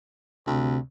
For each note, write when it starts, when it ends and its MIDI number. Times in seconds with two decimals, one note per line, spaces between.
0.47 0.77 38
0.47 0.78 48